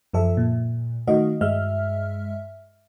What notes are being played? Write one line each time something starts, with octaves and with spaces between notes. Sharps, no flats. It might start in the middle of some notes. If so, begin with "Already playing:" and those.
F#2 F3 A4 E5
A#2
D#3 A3 F#4 D#5 F5
G2 G#3 E5 F6